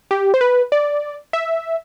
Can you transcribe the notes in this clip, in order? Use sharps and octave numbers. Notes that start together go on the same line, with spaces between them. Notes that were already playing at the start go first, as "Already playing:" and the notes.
G4
C5
B4
D5
E5